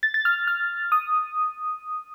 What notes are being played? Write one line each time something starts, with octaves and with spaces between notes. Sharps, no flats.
A6
A6
F6
F6
D#6